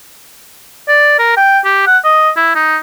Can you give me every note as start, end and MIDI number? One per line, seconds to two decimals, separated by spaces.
0.88 1.16 74
1.19 1.33 70
1.37 1.60 79
1.65 1.86 67
1.86 1.98 78
2.04 2.30 75
2.37 2.55 64
2.55 2.78 63